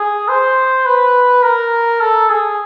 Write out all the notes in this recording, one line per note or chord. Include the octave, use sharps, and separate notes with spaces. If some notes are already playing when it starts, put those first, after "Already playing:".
Already playing: G#4
C5
B4
A#4
A4
G#4